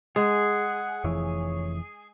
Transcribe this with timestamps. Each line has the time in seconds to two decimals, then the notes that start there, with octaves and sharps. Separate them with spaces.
0.16 G#3 G#4 F#5
1.04 F1 F2 E3 C#5